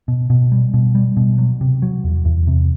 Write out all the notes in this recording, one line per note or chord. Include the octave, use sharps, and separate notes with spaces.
B2
B2
G3
B2
G3
B2
F#3
C3
F#3
E2
E2
C3